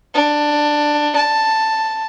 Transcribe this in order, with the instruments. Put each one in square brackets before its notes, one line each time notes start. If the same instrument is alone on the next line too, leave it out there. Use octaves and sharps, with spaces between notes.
[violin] D4
A5